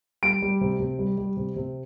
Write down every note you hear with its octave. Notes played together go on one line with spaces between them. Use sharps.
G3 D7
G3
C3
C3
G3
G3
C3
C3